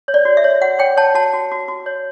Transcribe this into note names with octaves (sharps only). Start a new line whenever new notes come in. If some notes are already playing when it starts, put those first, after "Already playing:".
C#5
D5
F#4
E5
C#5
F#4 F#5
C#5 G5
C#5 A5
F#4 A5
F#4
F#4
F#4
C#5